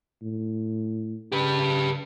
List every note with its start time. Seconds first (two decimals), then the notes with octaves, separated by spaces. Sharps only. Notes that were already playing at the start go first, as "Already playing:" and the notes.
0.22 A2
1.32 C#3 G4 B4